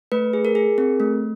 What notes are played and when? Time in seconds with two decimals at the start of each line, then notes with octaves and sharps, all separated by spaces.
0.12 A3 B4
0.33 G#4
0.45 A#4
0.55 G#4
0.78 C4
1.00 A3